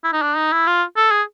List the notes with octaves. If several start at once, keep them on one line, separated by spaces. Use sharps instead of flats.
E4
D#4
D4
D#4
E4
F4
A4
G#4